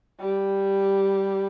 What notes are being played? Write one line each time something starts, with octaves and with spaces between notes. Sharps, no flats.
G3